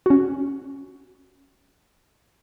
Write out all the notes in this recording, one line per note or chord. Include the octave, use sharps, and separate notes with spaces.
C#4 F#4